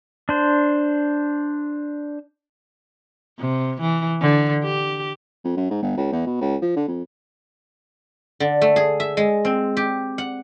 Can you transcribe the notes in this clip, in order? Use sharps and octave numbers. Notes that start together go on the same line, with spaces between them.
D4 C5
C3
E3
D3
G4
F2
F#2
G#2
G1
C#2
E2
B2
C#2
F3
D3
F2
D3
A3
G#4
E5
G#3
C4
G4
F#5